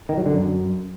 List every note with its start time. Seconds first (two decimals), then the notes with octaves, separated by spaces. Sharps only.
0.09 D#3
0.17 F#3
0.26 D3
0.34 F#2